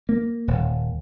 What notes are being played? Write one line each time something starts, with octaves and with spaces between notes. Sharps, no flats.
A#3
D#1